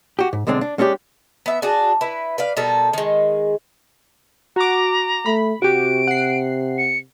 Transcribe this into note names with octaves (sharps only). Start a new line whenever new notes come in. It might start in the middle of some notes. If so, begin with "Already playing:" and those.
F#4 G4
G#2
B1 D3 G#3 C4 D4
D4
G#3 C#4 D4 E4 G4
B3 E5
D4 F#4 G#4
E4 B4
B4 D5 F5
B2 G3 A4 A#4
D#3 G#3
F#4 A#5 D6
A3 B5
C3 F#4 G4 D7
F#5 C7
C#7